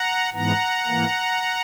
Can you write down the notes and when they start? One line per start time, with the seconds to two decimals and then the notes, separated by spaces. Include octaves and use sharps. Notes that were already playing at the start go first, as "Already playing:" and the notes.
Already playing: F#5 A#5
0.34 G#2 E3 B3 F#5 A#5
0.86 G#2 E3 A#3